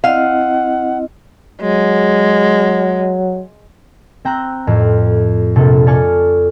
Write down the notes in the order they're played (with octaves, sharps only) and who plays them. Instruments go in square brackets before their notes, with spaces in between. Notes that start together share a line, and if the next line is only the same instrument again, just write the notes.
[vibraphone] C4 E4 D#5 [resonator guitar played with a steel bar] F5 [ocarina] F#5
[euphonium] F#3 [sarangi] G#3
[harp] C4 G5 A#5 E6 F#6
F2 A2
A#1 C3 A4
A4 D5 F5 G#5 C#6 G#6